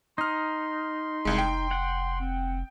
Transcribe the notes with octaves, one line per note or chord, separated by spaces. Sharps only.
D#4 C6 D#6 F6
F1 C2 G#3
G5
F#5
C4